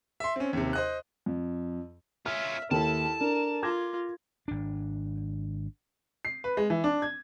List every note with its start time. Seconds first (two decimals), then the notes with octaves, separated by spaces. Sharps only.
0.20 E5 C6
0.36 C4 C#4
0.53 D#2 C3
0.73 C5 D#5 F#6
1.26 F2
2.26 C#4 F4 E5 F6
2.71 D#2 E4 A4 A5
3.21 D4 A#4
3.63 F4 D6 G#6 A#6
4.48 G#1 D4
6.25 C7
6.44 B4
6.57 G#3
6.70 E3
6.84 D4
7.02 G#6